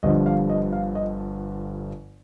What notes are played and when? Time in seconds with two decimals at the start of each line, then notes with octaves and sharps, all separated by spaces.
0.03 G1 G2 D3 F3 D#5
0.26 F5
0.50 D#5
0.72 F5
0.95 D#5